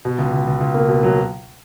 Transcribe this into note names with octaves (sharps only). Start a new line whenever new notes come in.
B2
C#2
C#2
C#2
C#2
A#3
B2
F#3